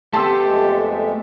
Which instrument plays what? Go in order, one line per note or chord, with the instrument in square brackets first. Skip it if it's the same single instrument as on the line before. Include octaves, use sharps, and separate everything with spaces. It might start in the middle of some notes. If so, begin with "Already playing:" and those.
[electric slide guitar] A3 B3 [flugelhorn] G4 [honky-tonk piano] A5 C6 E6
[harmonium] F2 G#3 E5